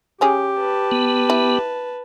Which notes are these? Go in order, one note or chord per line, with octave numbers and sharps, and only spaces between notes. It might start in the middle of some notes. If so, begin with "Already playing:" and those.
C#3 C#4 G4 G#4
B4 A5
B3
E4